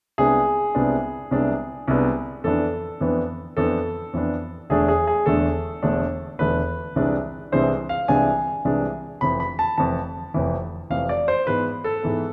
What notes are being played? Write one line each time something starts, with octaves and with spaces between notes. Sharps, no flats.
C2 C3 G#3 B3 D4 G#4
C2 C3 G#3 B3 D4
C2 C3 G#3 B3 D4
C2 C3 G#3 B3 D4
F2 E3 B3 D4 A4
F2 E3 B3 D4
F2 E3 B3 D4 A4
F2 E3 B3 D4
E1 E2 D3 A3 D4 G#4
G#4
G#4
E1 E2 D3 A3 D4 A4
E1 E2 D3 A3 D4
E1 E2 D3 A3 D4 B4
C2 C3 E3 G#3 D4
C2 C3 E3 G#3 D4 C5
F5
C2 C3 E3 G#3 D4 G#5
C2 C3 E3 G#3 D4
F1 F2 E3 B5
B5
A5
F1 F2 E3 A5
F1 F2 E3
F1 F2 E3 F5
D5
C5
G#2 E3 B3 B4
A4
G#2 E3 B3